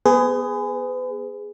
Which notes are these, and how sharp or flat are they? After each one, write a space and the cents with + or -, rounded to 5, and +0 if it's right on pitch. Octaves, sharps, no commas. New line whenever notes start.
B3 -10 G#4 +0 B4 +40